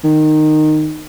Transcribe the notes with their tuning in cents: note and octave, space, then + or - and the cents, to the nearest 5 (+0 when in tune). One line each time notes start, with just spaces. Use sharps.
D#3 -15